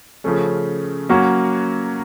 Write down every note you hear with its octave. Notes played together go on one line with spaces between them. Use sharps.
C#3 F3 A3 C#4
F#3 A#3 C#4 F#4